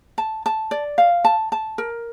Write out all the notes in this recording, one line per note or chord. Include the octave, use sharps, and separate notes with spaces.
A5
A5
D5
F5
A5
A5
A#4